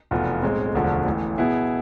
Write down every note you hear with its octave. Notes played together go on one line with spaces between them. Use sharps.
F1 E2 B2 B3 F4
B1 A2 G#3 C4
E1 D2 D3 F3 A3
A1 A2 E3
B2 B3 E4 G#4